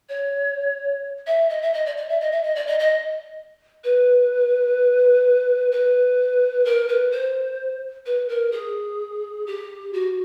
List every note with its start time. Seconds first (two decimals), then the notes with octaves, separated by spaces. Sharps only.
0.09 C#5
1.27 E5
1.49 D#5
1.62 E5
1.73 D#5
1.86 D5
1.97 D5
2.09 E5
2.20 D#5
2.32 E5
2.43 D#5
2.55 D5
2.67 D#5
2.79 D#5
3.84 B4
5.72 B4
6.65 A#4
6.88 B4
7.12 C5
8.06 B4
8.29 A#4
8.52 G#4
9.47 G4
9.93 F#4